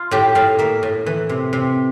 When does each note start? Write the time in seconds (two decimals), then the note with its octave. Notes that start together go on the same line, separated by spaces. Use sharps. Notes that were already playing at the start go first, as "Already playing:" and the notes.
Already playing: F4
0.11 A2 G4
0.35 A2 F5
0.59 A#3 E5
0.83 A2
1.06 E3
1.29 C3
1.53 C3